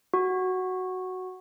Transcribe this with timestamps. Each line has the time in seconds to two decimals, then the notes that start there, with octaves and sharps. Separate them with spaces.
0.14 F#4